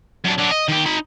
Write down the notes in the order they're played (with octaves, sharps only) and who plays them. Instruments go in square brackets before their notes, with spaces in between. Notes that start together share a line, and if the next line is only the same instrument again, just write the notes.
[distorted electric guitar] F#2 D4
F#3 D4
D#5
D#3 G4
D#4 B5